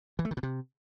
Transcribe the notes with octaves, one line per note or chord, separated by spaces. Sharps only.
E3
A3
D#3
B2
C3